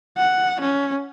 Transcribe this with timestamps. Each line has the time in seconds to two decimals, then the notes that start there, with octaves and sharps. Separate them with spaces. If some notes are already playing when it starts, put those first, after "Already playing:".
0.17 F#5
0.61 C#4